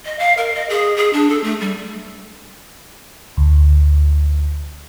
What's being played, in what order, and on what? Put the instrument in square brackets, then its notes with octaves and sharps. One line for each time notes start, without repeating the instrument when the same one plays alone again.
[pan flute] D#5
F5
A#4
D#5
G#4
G#4
D4
A4
A3
G3
[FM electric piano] D2